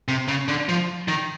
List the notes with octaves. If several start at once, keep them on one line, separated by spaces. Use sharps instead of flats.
C3
C#3
D3
F3
D#3